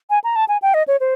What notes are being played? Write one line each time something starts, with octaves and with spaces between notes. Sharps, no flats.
G#5
A#5
A5
G#5
G5
D#5
C#5
C5